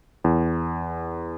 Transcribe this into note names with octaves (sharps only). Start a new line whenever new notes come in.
E2